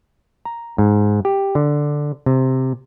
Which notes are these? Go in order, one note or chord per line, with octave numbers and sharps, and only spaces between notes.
A#5
G#2
G4
D3
C3